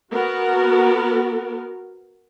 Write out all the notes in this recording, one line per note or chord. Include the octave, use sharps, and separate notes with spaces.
B3 F#4 A#4